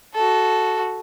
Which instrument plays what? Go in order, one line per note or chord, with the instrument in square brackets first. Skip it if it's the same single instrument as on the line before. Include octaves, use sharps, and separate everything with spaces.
[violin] F#4 A4